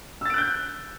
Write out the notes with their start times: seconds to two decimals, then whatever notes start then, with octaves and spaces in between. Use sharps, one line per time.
0.21 E6
0.25 A6
0.30 D7
0.34 F#6
0.38 G6